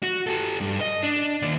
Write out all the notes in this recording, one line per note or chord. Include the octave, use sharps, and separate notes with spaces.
F#4
G4 A4
G2
D#5
D4
D#2 D5